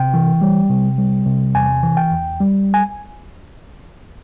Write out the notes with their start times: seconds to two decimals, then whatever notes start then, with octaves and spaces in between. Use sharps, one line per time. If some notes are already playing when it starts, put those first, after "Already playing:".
Already playing: C3 G5
0.14 E3
0.41 G3
0.70 C3
0.98 G3
1.27 C3
1.55 E2 G#5
1.83 E3
1.97 G5
2.11 E2
2.40 G3
2.74 G#5